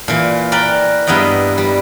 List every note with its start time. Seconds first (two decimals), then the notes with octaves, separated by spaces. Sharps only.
0.08 A#2 E3
0.52 A#4 B4 D5 G5
1.07 G2 B3 E4 A#4 D#5 G5
1.58 G3